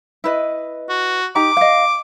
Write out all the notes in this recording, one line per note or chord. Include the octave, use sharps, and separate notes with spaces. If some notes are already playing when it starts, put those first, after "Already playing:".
E4 B4 D#5
F#4
D#4 G4 A#5 D6
D#5 F5